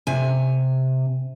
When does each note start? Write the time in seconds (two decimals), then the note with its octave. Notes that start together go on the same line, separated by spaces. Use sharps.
0.07 C3 G#5